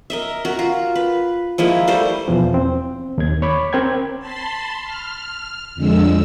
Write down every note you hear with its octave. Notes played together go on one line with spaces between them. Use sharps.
A#4 D#5 E5
F#4 A#4
F4
B4
F3 G#3 A#3 E4
G3 A3 A4 C5
E2 B2 E3 F3
C4
D#2 G#6
C#5 B5 D6
C4 A#4 G5 G#6
A5 B5 C6
F6
F2 D3 G#3 E6